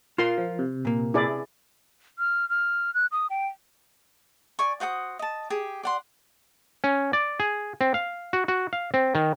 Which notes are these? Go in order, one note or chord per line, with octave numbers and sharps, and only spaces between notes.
F4 A#4 F5 C6
F3
C3
A#2 A#3
E4 G#4 D5
F6
F6
F#6
D#6
G5
D5 G#5 C#6
F#4 C5 F#5 D#6
D#5 A5
G4 G#4
D5 F#5 C6
C#4
D5
G#4
C4
F5
F#4
F#4
F5
C4
D#3